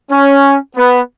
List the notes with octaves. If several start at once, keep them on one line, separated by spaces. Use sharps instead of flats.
C#4
B3